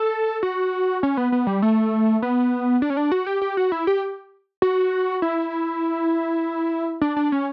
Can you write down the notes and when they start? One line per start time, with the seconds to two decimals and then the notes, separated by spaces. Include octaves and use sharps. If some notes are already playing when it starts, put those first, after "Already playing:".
Already playing: A4
0.43 F#4
1.03 C#4
1.17 B3
1.32 B3
1.47 G3
1.62 A3
2.22 B3
2.82 D4
2.90 C#4
2.97 D4
3.12 F#4
3.27 G4
3.42 G4
3.57 F#4
3.72 E4
3.87 G4
4.62 F#4
5.22 E4
7.01 D4
7.17 D4
7.32 C#4